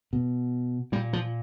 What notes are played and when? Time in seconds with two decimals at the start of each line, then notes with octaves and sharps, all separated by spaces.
0.13 B2
0.92 A#2 G3
1.13 F3